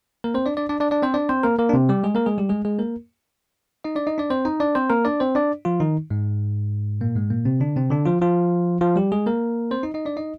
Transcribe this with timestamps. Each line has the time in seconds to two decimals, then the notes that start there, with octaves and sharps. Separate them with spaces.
0.24 A#3 A#4
0.34 C4 C5
0.46 D4 D5
0.57 D4 D5
0.69 D4 D5
0.80 D4 D5
0.91 D4 D5
1.03 C4 C5
1.14 D4 D5
1.29 C4 C5
1.43 A#3 A#4
1.58 A#3 A#4
1.69 D4
1.74 C3 C4
1.89 G3 G4
2.04 G#3 G#4
2.15 A#3 A#4
2.26 G#3 G#4
2.38 G3 G4
2.49 G#3 G#4
2.65 G#3 G#4
2.79 A#3 A#4
3.84 D#4 D#5
3.95 D4 D5
4.07 D#4 D#5
4.18 D4 D5
4.30 C4 C5
4.45 D#4 D#5
4.60 D4 D5
4.75 C4 C5
4.90 A#3 A#4
5.05 D4 D5
5.20 C4 C5
5.35 D4 D5
5.65 F3 F4
5.80 D#3 D#4
6.10 G#2 G#3
7.01 A#2 A#3
7.16 G#2 G#3
7.30 A#2 A#3
7.45 C3 C4
7.60 D3 D4
7.76 C3 C4
7.90 D3 D4
8.05 F3 F4
8.22 F3 F4
8.81 F3 F4
8.96 G3 G4
9.12 G#3 G#4
9.26 A#3 A#4
9.71 C4 C5
9.83 D#4 D#5
9.94 D#4 D#5
10.05 D4 D5
10.17 D#4 D#5